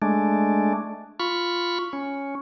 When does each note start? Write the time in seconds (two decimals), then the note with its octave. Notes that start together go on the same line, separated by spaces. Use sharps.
0.02 G#3 A3 D4
1.20 F4 B5 C#6
1.93 C#4